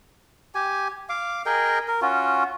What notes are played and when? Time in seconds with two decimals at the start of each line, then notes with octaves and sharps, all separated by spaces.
0.55 G4 G#5
1.09 F5 D6
1.46 G#4 A#4 D#5 G5
1.88 A#4
2.02 C#4 F4 F#4